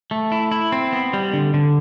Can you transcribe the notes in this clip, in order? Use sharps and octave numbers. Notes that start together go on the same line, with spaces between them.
A3
E4
E4
C4
B3
G3
D3
D3